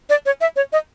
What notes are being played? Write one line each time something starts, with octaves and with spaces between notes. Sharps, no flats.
D5
C#5
E5
C#5
D#5